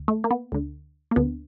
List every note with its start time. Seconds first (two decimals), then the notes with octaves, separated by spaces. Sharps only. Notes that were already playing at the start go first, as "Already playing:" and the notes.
Already playing: D2
0.08 A3
0.24 A#3
0.31 B3
0.52 D2 D3
1.11 A#3
1.16 D2 D3 B3